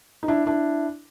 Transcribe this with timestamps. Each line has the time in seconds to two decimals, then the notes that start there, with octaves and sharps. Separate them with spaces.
0.23 D#4
0.28 D4 E4
0.46 D4 E4